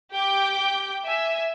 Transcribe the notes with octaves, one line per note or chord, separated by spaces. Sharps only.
G4 G5 D6 G6
E5 G#5